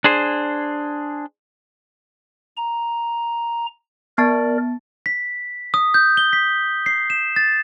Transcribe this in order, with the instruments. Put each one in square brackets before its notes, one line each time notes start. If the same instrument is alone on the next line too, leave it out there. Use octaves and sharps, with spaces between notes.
[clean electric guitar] D4 G#4 C5
[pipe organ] A#5
[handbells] B3 A5 A6 [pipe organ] A#4 D5
[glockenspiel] B6
D#6
G6
G7
B6
C7
E7
A6